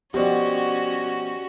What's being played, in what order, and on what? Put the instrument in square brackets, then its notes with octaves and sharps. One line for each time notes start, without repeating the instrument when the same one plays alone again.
[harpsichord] B2 F3 [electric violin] C#4 F#4 [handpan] G4 D5